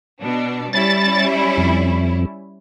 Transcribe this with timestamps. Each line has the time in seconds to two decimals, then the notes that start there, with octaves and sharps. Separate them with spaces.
0.20 B2 D4
0.73 G3 C#4 E4 A6
1.57 F2